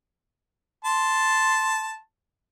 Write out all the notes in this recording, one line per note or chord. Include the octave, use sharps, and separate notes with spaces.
A5 C6